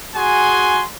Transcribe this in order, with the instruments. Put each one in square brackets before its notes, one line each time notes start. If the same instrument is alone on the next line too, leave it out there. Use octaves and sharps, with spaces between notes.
[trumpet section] F#4 G#4 G#5 C6